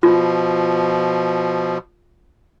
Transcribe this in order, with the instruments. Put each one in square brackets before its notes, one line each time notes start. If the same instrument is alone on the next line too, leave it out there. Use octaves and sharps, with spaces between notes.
[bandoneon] B2 F3 [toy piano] F4